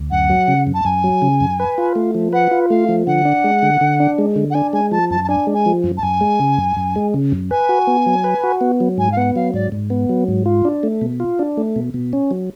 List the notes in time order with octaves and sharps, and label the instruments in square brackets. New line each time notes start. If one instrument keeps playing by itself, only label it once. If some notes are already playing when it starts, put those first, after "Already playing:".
Already playing: [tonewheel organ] D2
[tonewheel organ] F#2 [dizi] F#5
[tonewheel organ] F#3
C#3
F#2
[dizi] A5
[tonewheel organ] F#2 [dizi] G#5
[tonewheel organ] F#3
C#3
F#2
B4
F4
A3
F3
[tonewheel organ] B4 [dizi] F#5
[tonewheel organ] F4
[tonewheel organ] A3 [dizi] F5
[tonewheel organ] F3
[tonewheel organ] D3 [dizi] F#5
[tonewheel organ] D4
G#3
D3
D3
D4
G#3
D3
[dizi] F#5
[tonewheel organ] D4 [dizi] G#5
[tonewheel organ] G#3 [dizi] G#5
[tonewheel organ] F3 [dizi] A5
[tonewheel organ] F#2 [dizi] A5
[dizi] A5
[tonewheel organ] D4 [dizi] G#5
[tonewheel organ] G#3
[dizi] G#5
[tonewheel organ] F3
F#2
[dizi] A5
[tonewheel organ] F#2 [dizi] G#5
[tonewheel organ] G#3
C#3
F#2
F#2
G#3
C#3
F#2
[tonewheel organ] B4 [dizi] G#5
[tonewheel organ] F#4
B3
F#3
B4
F#4
B3
F#3
[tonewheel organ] G#2 [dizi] G#5
[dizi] F5
[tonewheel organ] B3 [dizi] F#5
[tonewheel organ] F#3 [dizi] F5
[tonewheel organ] G#2 [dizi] D5
[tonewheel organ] G#2
B3
F#3
G#2
F4
D4
A3
B2
F4
D4
A3
B2
B2
C#4
F#3